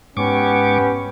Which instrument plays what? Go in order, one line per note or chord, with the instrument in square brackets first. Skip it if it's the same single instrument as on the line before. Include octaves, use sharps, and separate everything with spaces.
[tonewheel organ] G#2 C#6 D6 [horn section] B3 C#4 G4